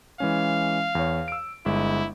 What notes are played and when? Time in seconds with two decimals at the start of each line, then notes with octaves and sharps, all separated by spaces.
0.20 E3 G#3 C#4 F5
0.95 E2 C#5
1.28 E6 D7
1.66 G1 G#3 E4